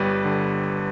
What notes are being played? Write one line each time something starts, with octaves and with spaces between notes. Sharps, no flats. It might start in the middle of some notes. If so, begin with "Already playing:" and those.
Already playing: G1 G3 B4
D3